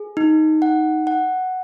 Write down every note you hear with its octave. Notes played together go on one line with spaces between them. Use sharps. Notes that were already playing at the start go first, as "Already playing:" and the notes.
Already playing: G#4
D#4
F#5
F#5